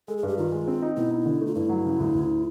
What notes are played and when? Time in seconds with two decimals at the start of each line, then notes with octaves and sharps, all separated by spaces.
0.08 G#3 A4
0.17 G#4
0.23 G2
0.28 G4
0.38 D#3 F4
0.52 G#3
0.68 C4
0.82 D#4
0.96 B2 E4
1.11 D#4
1.25 D3
1.41 A3
1.47 F4
1.55 G2 E4
1.69 F#3
1.85 C#3
2.00 D2
2.15 D2